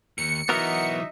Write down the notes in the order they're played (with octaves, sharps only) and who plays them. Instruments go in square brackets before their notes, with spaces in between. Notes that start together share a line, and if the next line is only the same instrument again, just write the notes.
[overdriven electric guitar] D#2 [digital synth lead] C#7
[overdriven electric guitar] E3 F#3 [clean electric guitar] B3 F#4 A#4 [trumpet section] D#4 D#5 E5